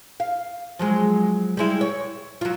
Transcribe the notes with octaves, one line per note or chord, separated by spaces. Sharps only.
F5
F3 F#3 G#3
G3 G#3 E4
C#5
F#3 F4